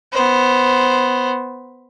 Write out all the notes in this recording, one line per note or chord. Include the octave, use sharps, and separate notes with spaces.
B3 C5